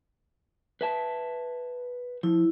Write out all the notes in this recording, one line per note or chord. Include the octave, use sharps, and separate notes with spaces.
B4 E5 A5
F3 E4